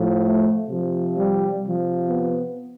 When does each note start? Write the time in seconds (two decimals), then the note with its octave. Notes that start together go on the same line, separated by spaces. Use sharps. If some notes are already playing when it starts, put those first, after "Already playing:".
Already playing: A2 F3
0.24 A3
0.69 C3 F3
1.16 G3
1.62 C3 F3
2.08 B3